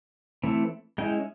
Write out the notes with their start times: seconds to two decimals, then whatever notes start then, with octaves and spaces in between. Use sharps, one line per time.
0.43 E3 A3 C4 E4
0.98 G#3 C#4 E4 G5